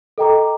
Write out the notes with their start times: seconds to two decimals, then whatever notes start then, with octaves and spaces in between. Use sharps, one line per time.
0.18 A4 D#5 G5 A#5 D6